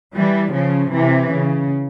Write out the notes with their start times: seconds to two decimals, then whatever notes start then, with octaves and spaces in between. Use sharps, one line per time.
0.16 E3 G3
0.55 C#3 F3
0.94 C3 E3
1.33 C#3